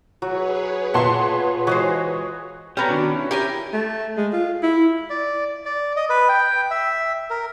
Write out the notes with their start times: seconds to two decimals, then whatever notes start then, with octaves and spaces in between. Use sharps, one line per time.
0.22 F#3 F#4 G#4 B4 C#5
0.94 A#2 F4 E5 F#5 A5 C6
1.67 E3 G#3 F#4 C5 C#5 D#5
2.77 B3 C#4 G4 A4 A#5
2.89 D#3 D4 F#4
3.12 E4
3.31 G4 A#4 G#5
3.73 A3
4.17 G#3
4.33 F4
4.63 E4
5.10 D5
5.65 D5
5.96 D#5
6.10 B4
6.29 G5
6.71 E5
7.30 A#4